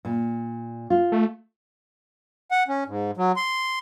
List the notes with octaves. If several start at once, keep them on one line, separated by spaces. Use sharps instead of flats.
A#2
F4
A3
F#5
C#4
G#2
F#3
C6